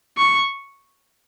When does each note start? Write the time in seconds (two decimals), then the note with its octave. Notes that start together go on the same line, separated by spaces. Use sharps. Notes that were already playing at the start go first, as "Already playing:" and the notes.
0.18 C#6